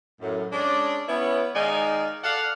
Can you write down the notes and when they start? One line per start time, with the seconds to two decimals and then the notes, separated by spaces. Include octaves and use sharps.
0.21 F#2 A2
0.52 G#3 C#4 D4
1.09 B3 C#4 E4
1.55 D#3 G#3 D#4 D5 F5 G#5
2.24 A4 D5 F5 F#5